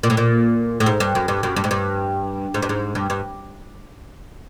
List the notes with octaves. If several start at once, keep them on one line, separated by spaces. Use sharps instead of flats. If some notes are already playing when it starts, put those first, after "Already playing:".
A#2
A2
A#2
A2
G#2
G2
F#2
G2
F#2
G2
G#2
G2
G#2
G2
G#2
G2
G2